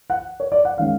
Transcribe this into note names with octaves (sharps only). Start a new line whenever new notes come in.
F#5
C#5
D5
F#5
D#3 G#3 C#4 F5